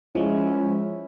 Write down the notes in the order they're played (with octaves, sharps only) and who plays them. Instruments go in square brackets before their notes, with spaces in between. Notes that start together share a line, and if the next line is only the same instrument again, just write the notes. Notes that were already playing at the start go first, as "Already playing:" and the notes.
[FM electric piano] F3 G#3 [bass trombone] C#4 [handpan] E4